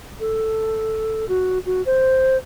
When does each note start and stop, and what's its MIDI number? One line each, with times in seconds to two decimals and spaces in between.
0.20 1.25 69
1.28 1.59 66
1.66 1.82 66
1.86 2.37 72